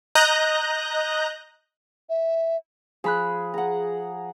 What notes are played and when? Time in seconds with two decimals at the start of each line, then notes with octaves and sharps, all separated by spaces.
0.15 D#5 A#5 F#6 G6 A#6
2.09 E5
3.04 F3 G#4 B5 F#6
3.54 G#4 F#5 A#5